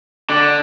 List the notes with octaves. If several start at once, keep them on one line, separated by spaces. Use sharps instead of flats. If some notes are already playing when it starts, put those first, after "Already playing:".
D3